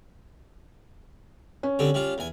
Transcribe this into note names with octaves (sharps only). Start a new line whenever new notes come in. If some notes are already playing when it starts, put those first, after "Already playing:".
C#4
D3 G3 C4
G3 F4
E2 G#5